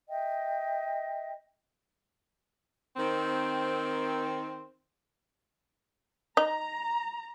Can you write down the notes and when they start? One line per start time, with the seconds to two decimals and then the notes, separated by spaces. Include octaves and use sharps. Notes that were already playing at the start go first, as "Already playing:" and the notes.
0.09 D#5 E5 G5
2.97 D#3 C4
6.37 D#4 A#5